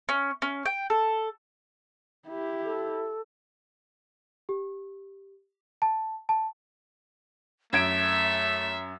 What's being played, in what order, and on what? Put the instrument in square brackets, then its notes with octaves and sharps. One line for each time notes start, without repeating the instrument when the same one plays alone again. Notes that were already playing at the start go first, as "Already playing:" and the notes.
[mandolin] C#4
C#4
G5
A4
[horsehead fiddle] E4 G4
[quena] A4
[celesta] G4
A5
A5
[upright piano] F#2 G#6 D7 [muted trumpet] A3 [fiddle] E5 [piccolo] E7